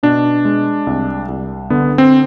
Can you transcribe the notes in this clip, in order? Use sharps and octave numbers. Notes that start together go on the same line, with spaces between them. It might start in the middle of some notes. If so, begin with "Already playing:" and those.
B2 D4
G#3
C2
C2
D3 B3
C4